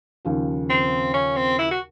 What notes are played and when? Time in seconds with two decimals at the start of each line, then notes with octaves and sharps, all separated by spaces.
0.25 D#2 C#3 F3
0.70 C4
1.14 C#4
1.36 C4
1.58 E4
1.71 F#4